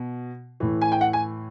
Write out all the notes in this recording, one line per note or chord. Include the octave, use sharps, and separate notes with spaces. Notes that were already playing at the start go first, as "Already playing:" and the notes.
Already playing: B2
A2 E3
G#5
G5
F#5
G#5